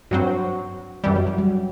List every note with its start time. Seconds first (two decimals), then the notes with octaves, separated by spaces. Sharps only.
0.11 G2 F#3 C4 F#4
1.04 F#2 E3 G3
1.16 F#3
1.27 F#3
1.38 G3